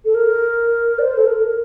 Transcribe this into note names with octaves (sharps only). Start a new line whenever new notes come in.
A4
A#4
D5
C5
A4
A#4
A#4